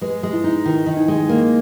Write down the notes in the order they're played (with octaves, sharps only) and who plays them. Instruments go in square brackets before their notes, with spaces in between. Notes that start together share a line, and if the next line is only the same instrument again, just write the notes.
[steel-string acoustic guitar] G#3 [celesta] B4
[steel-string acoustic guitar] G#3
[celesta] E4
[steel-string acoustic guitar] D#4
[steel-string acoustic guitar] D#3 [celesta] E4
[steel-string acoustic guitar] D#3
[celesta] D#4
[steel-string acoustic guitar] G#3
A#3